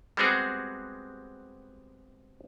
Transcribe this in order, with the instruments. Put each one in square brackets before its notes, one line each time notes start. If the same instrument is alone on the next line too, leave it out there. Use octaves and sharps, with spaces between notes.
[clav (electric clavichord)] G3 G#3 B3 C4 F#4 G#4